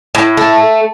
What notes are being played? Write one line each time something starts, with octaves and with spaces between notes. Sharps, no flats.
A2
A3